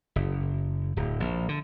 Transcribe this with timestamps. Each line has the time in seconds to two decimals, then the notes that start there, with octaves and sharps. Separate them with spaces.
0.16 F#1
0.97 D1
1.20 A#1
1.49 D3